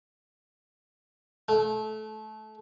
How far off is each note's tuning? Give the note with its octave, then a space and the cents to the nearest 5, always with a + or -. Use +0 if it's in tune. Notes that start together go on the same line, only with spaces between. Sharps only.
A3 -25